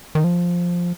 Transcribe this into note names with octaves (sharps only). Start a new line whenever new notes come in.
D#3
F3